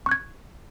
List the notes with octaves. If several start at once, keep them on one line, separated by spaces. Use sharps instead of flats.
C#6 F#6 G#6